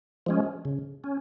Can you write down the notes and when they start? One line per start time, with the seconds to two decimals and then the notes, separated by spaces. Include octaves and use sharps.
0.26 F3 G#3 C#4
0.65 C#3
1.04 C#4